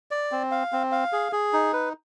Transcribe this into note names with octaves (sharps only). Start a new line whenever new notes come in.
D5
C4
F5
C4
F5
G#4
G#4
D#4
B4